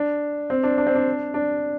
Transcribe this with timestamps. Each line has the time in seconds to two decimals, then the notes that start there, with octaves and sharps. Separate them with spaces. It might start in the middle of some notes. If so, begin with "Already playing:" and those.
Already playing: D4
0.50 C4
0.63 D4
0.78 D4
0.87 C4
0.95 D4
1.34 D4